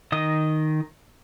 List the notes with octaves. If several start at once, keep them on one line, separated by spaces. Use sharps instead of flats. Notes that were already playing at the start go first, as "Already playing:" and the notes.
D#3 D#5 D#6